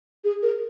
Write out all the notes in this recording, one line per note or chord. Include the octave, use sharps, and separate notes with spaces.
G#4
A#4